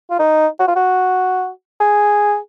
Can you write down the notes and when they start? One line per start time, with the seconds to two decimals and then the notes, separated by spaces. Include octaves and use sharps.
0.10 F4
0.19 D#4
0.60 F#4
0.68 F4
0.76 F#4
1.80 G#4